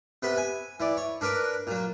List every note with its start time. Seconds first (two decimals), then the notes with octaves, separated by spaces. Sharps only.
0.23 C3 B3 B4
0.38 G#5
0.80 E3 D5
0.97 C#5
1.21 D4 A#4 B4 D5
1.67 A#2 F#3